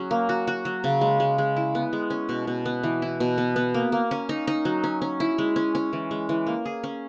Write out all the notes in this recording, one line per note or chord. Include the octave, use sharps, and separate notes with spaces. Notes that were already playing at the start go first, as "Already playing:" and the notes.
Already playing: F#3 C#4 G#4
A#3
F#4
F#4
F#3
C#3
G#3
G#3
G#3
E4
B3
G#3
C#4
B2
B2
B3
E3
E4
B2
B3
B3
A#3
A#3
C#4
D#4
D#4
F#3
C#4
C#4
E4
G#3
C#4
C#4
E3
G#3
E3
A#3
G#4
C#4